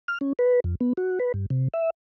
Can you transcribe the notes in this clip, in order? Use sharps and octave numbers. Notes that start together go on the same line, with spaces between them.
F6
C#4
B4
F2
B3
F#4
B4
G2
C3
E5